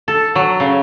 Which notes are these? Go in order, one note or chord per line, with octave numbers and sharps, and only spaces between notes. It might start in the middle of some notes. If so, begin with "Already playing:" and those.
A4
F#3
C#3